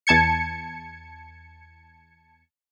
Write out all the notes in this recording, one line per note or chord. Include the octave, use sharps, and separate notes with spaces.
E2 A5 G#6 C#7